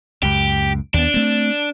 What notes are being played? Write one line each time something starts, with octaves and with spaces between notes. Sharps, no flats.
C#2 F#2 G4
D#2 B3 D4
A3 C4